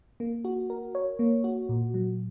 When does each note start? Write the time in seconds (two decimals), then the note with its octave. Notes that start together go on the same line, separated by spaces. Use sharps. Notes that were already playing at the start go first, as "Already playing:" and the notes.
0.20 A#3
0.45 F#4
0.70 A#4
0.95 C#5
1.19 A#3
1.44 F#4
1.69 A#2
1.94 F#3